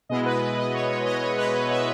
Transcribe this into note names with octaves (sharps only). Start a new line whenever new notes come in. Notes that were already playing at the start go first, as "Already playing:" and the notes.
B2 G#3 B3 E4 D#5
B4
B4
D#5
C#5
C#5
D#5
C#5
B4
E5